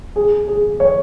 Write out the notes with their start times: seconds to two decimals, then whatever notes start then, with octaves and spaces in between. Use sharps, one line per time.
0.16 G#4
0.48 G#4
0.80 C#5